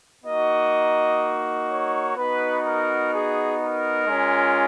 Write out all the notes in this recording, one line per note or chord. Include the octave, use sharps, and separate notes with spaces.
A#3 D#4 F#4 D#5
C#5
B3 D#4 F#4 B4
A#4
G#4
A#4
G#3 C#4 F4